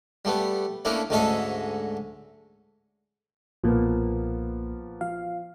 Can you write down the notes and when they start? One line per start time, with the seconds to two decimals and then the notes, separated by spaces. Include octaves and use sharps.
0.25 G3 A3 B3
0.85 A3 A#3 C#4 D4 E4
1.10 D2 G#2 G#3 C#4 A4 E5
3.64 B1 A#2 F3 A#3 B3
5.01 F3 F5